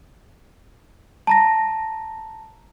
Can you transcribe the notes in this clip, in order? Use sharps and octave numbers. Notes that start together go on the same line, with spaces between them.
A5 A#5 A#6